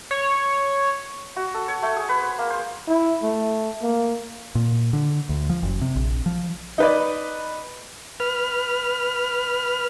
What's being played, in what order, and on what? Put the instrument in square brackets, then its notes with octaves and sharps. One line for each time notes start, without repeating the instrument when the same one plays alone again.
[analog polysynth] C#5
[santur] F#4
A4
C#5
A3
G#4
B4
C5
A#3
C5
[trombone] E4
A3
A#3
[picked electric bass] A#2
D3
D2
F3
F#1
C3
A#1
F3
[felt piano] D#4 B4 D5
[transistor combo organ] B4 F6